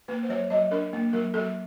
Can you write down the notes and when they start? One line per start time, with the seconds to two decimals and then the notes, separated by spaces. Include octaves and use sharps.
0.08 A#3 B4
0.23 C5
0.29 F#3 C#5
0.50 F#3 D#5
0.71 D4 A#4
0.93 A#3
1.13 F#3 A#4
1.34 F#3 A4